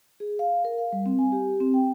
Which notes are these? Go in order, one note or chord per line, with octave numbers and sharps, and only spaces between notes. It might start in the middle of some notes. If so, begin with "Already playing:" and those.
G#4
F5
A#4
F5
G3
C4
G#5
G4
C4
G5